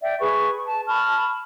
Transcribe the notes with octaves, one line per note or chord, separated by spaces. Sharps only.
D5 E5 G5
G#4 B4 C#6
A5
A5 B5 C#6 F6